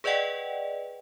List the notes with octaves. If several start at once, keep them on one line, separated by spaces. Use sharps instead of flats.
G#4 B4 D5 D#5 F#5 G5